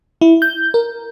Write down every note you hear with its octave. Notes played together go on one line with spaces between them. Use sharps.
E4
G6
A#4